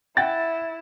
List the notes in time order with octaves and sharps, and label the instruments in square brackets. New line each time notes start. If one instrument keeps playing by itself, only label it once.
[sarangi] E4 [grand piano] F#5 G5 A6